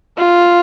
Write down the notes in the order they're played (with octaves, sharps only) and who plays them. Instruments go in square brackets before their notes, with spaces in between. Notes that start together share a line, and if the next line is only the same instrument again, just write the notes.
[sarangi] F4